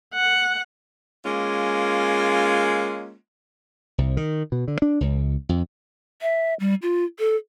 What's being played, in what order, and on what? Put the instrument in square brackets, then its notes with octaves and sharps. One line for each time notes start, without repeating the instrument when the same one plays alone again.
[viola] F#5
[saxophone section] G#3 A#3 C#4 F4
[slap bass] C2
D#3
B2
D3
D4
C#2
F2
[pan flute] E5
G3
F4
A4